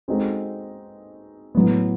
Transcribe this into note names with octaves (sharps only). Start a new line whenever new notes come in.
G#3 C4 D#4 F#4 A4
A2 F#3 B3